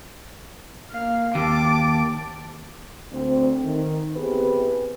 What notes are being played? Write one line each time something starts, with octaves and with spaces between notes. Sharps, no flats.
A#3 F5
D#2 A5 D6
D2 C4
D#3
B3 C4 E4 G4 G#4 B4